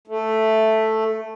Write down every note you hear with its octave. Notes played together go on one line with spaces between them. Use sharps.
A3